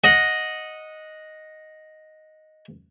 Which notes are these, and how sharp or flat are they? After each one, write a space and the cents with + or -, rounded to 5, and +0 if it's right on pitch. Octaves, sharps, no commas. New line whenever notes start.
D#5 +0 F#5 -15